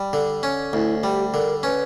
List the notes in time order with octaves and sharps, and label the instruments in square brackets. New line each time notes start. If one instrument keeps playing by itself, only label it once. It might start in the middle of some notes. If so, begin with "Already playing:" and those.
Already playing: [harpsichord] G3
D3
C#4
[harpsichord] D2 [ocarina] E4
[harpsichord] G3 [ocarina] G4
[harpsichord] D3 [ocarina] A#4
[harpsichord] C#4 [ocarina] B4